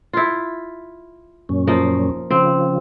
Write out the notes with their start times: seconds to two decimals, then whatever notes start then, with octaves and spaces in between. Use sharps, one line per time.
0.13 E4 F4
1.49 F#2 A#2 C#4
1.67 F3 A#3 D#4
2.31 C#3 F3 C4